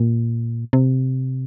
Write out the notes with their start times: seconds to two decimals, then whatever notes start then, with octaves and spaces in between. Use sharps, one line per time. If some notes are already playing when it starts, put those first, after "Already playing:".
Already playing: A#2
0.73 C3